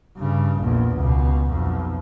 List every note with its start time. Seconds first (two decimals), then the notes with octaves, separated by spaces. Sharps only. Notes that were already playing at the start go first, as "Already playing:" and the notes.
0.17 G2 C#3
0.60 A#1 E2
0.98 C#2 B2
1.49 B1 F2